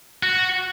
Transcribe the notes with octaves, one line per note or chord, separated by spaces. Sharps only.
F#4